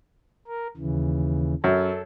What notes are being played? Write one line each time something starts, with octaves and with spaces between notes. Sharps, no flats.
A#4
D#2 C#3 E3
F#2 A4